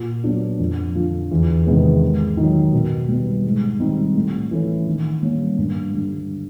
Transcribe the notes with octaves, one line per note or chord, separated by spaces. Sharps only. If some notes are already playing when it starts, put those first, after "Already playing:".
Already playing: A#2
F#3 B3 D4
F2
D3 F3
E2
C3 D#3 G#3 B3
G#2
D#3 F#3
B2
G3 B3
G#2
D#3 G3 C4 D#4
A2
E3 A3 C#4
D#3
G3 A#3 C#4
G2
D3 G3